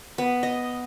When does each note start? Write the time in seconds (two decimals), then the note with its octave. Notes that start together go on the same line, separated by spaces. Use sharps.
0.18 B3
0.43 D#5